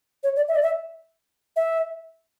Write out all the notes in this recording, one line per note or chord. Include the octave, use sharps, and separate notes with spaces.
C#5
D5
E5
D5
E5
E5